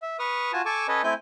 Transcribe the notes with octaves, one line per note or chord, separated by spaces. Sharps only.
E5
B4 C#6 D#6 F6
F4 F#4 G#5 A5
A4 G#5 A5 C#6 D6
C#4 A4 B4 C#5 D#5
A3 C4 E4 G#5 G6